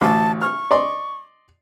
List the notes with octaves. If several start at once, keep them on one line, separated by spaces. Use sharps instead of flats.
A1 D2 A5 D6
C#6 F6
D5 D#5 C6